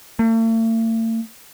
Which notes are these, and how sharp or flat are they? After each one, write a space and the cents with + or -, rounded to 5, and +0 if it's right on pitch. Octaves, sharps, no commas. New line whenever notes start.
A3 +45